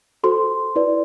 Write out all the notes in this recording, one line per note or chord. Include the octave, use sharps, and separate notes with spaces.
F#4 A4 C5 C6
E4 B4 D5